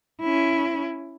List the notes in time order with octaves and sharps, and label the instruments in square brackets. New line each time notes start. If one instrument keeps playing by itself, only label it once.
[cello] C#4 E4